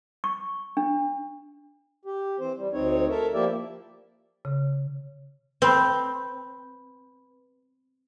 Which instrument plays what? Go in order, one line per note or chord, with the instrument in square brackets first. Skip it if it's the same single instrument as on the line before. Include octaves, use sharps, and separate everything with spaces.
[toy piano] C#6
D4
[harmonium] G4
E3 C4 C5
G3
D2 C4 D#4 C#5
A4 A#4 E5
F3 A#3 E4 G4 D5 E5
[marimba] C#3
[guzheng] C4 [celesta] B4 B5